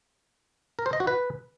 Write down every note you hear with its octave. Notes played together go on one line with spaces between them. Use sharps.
A#4
C5
D#5
F#4
B4